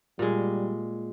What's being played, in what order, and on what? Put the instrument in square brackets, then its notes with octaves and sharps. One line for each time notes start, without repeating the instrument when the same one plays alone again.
[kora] A#2 G#3 [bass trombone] G3